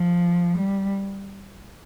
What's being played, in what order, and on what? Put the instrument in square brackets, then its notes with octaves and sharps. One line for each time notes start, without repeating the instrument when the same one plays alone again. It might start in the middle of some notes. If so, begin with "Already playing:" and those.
Already playing: [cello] F3
G3